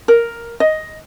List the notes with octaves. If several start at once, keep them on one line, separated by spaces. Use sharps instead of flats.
A#4
D#5